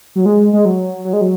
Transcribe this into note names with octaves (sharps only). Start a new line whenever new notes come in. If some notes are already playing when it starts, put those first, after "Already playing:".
F#3
G#3
G#3
F#3
F#3
G#3
F#3